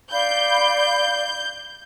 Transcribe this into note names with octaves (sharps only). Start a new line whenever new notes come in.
D5 F5 B5 G6